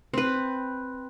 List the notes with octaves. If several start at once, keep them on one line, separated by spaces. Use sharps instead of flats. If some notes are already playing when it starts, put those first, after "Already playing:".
C4 B4